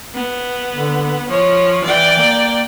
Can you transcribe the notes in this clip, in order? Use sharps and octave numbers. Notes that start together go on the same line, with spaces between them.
B3
D3
F3 C#5
E3 D5 G5
A#3